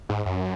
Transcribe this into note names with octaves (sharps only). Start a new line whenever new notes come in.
G#2
F#2